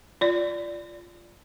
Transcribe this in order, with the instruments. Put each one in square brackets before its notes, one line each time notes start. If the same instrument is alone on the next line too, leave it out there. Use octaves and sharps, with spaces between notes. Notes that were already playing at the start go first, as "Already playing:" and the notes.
[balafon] F4 D5